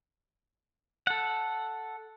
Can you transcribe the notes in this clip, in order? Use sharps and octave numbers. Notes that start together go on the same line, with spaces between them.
A4 F#5